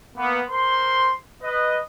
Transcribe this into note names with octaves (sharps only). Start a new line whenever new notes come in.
A#3 B3
A#4 C5 C6
B4 D#5